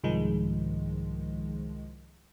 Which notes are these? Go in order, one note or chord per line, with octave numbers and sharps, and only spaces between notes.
C2 G#2 D#3 F3 G#3